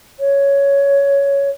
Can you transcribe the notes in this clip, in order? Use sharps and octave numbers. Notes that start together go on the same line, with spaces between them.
C#5